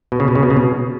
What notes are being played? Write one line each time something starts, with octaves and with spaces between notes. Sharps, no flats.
B2
C#3
B2
C#3
B2
C#3
B2